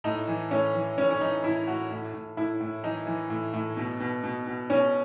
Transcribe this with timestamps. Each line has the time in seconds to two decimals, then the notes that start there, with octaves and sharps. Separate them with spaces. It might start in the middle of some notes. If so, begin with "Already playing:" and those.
0.04 A2 D#4
0.28 E3
0.51 A2 C#4
0.74 E3
0.98 A2 C#4
1.11 C#4
1.21 E3 D#4
1.44 A2 E4
1.67 A2 F#4
1.91 A2
2.14 A2
2.37 A2 E4
2.61 A2
2.83 E3 D#4
3.07 E3
3.30 A2
3.53 A2
3.77 B2
4.00 B2
4.24 B2
4.47 B2
4.70 B2 C#4